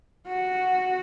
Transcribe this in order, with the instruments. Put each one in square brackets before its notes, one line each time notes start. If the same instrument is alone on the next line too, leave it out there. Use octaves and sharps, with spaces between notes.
[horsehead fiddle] F#4